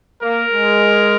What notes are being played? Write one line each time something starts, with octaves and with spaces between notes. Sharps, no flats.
A#3 A#4
G#3